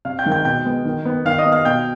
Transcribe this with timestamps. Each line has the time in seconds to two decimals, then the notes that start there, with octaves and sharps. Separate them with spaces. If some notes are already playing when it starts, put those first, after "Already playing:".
0.05 C3 F5 F6
0.19 G5 G6
0.25 D#3 G#3
0.32 G5 G6
0.45 B2 G5 G6
0.65 G#3 B3
0.85 D#3
1.06 B3
1.25 D#3 F5 F6
1.38 D#5 D#6
1.45 B3
1.52 F5 F6
1.65 B2 G5 G6